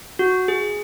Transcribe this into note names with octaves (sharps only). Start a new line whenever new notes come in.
F#4
G#4